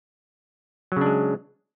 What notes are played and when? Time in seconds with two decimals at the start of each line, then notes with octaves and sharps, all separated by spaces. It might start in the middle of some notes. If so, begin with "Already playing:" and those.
0.92 F#3
0.97 C#3
1.01 D4
1.06 G#3